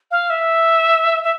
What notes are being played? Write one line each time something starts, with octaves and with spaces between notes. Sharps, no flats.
F5
E5
E5